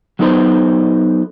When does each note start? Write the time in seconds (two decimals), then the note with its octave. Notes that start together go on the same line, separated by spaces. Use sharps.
0.19 F#3 B3 D#4 A4 C5